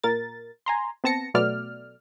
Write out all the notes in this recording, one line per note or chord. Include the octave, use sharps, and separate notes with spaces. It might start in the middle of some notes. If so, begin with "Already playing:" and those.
A#2 A#4 A6
G#5 A#5 C6
B3 C4 A5 A#6 C#7
B2 F#3 A3 B3 D5 F6